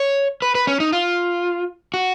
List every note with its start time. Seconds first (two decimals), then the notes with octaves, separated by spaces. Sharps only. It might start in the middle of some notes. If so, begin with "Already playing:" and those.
Already playing: C#5
0.42 B4
0.55 B4
0.67 C#4
0.80 D#4
0.92 F4
1.94 F#4